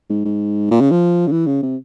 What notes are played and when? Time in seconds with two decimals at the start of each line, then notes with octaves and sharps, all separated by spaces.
0.10 G#2
0.25 G#2
0.71 A#2
0.81 C#3
0.91 F3
1.27 C#3
1.32 E3
1.47 C#3
1.62 C3